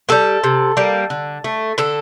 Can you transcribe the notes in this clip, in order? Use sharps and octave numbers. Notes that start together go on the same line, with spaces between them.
G3 A#3 A4
C3
G3 A#3
D3
A3
D3 A4